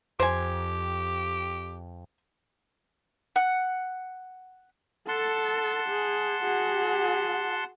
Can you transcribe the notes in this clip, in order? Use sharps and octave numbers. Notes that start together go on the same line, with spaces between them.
F2 G4 C5 G#5
F#5
A4 F#5 A5 C6
G#4
F#4 G#4